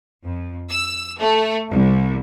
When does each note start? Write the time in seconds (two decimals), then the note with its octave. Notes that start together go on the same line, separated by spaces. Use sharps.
0.25 F2
0.69 E6
1.18 A3
1.70 C2